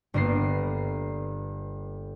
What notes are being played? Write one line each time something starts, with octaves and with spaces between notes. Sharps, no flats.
G1 A#3 B3 C7